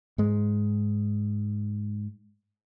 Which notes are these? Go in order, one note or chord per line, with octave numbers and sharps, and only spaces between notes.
G#2 G#3